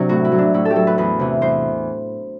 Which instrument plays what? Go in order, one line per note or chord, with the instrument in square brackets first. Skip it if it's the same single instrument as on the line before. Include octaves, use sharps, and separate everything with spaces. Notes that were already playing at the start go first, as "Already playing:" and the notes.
Already playing: [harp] C3 F#3 D4
A2 F#4
E4
F#3
D4
A2 E4
A4
G4
F#3 A4
B4
E2 B4
C3 E3
E2 C5